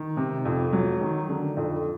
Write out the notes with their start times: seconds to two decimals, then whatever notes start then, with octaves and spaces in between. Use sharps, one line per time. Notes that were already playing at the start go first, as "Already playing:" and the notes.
Already playing: D#3
0.17 C3
0.45 F2
0.73 F#3
1.01 D#3
1.29 D3
1.57 F2